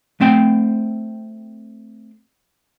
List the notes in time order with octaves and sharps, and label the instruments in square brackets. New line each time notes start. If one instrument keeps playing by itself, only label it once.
[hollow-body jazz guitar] A3 C4 G5